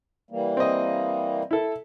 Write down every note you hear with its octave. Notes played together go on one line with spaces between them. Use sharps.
E3 G3 A#3
C4 D#5
E4 A4